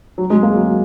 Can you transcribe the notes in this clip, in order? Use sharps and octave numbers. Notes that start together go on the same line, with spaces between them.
F#3
G#3
A#3
F#3